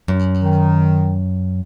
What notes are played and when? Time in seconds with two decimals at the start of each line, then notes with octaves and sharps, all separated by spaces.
0.08 F#2
0.41 D#3